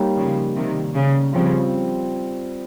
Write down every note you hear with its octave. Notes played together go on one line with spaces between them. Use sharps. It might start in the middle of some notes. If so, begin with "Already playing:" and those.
Already playing: G3 A#3 D#4 G4 C#5
C#3 F3
C3 D#3
C#3
C#3 F3 G3 C4 F4